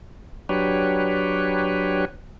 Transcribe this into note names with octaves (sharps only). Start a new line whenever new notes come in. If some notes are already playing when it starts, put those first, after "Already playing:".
F#3 D4 G4 B4 C#5